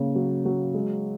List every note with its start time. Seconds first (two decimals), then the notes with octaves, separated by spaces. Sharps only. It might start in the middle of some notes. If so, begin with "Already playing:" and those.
Already playing: C#3 A#3
0.15 F#3
0.45 F#3
0.74 G#3